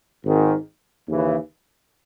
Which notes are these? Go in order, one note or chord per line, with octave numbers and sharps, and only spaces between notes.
G#1 G#2 D#3
D#2 C#3 E3